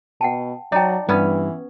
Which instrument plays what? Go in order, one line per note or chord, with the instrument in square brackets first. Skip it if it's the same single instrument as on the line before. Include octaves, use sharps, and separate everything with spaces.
[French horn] B2 [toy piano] F#5 G5 A5
[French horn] F#3 [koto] D#4 [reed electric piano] D5 A5 [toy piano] D#5 G5
[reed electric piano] G2 [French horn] E3 [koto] B3 C#4